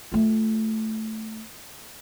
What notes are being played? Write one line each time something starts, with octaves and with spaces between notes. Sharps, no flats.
A3 F4